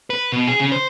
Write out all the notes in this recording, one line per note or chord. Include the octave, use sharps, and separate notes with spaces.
B4
B2
G#4
C#3
C5